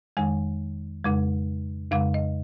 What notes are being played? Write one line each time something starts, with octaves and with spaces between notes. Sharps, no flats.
F2 D#3 G#3 G#5
F2 C#3 G#3
F2 C#3 G#3 F5
D#5